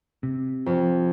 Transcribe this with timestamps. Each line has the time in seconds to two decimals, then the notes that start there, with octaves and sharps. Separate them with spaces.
0.23 C3
0.66 F2